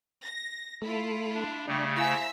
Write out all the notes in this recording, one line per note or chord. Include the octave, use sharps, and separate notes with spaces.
A#6
A3 E4 F4
D4
C#3 G3 A3 D4
E4 C5 E5 F5 G#5 A#5 E6